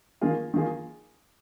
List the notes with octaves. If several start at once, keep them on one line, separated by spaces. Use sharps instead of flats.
D#3 A#3 F4 G#4
D#3 A#3 F4 G#4